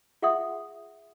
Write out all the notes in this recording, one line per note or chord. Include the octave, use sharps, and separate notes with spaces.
F4 G#4 E5 F#5 C6 D#6